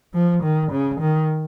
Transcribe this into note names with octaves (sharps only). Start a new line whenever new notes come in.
F3
D#3
C#3
D#3